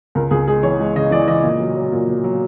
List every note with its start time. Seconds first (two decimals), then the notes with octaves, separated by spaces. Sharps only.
0.15 C#2 A#4
0.31 C#2 G#4
0.48 G#3 G#4
0.63 E3 C#5
0.80 G#3
0.96 C#3 D#5
1.11 E3 D5
1.27 E3 D#5
1.43 A#2
1.60 F#3
1.75 F#3
1.92 A#2
2.08 F#3
2.24 F#3